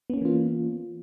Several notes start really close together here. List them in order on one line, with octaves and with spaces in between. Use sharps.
B3 C#4 A#3 E3 F4